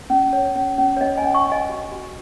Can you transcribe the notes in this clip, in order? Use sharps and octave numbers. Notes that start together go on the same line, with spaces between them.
C#4
C#5
C#4
C#4
C#5
C#4 D#5
D#5 G#5
C#4
G#5 C#6
C#4
D#5 G#5
F#4
F#4